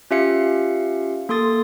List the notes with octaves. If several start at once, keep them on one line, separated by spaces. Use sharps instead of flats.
C#4 F4 G4 E5 F5 C#7
A#3 A4 C6 D#6 A6